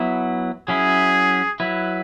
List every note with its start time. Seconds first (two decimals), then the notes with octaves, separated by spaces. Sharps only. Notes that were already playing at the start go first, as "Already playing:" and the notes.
Already playing: F#3 B3 E4
0.68 F#3 C#4 E4 G#4
1.60 F#3 E4 B4